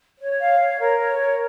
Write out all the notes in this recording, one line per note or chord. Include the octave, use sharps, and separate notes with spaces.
C#5
F5
C#5
A#4
C#5
A#4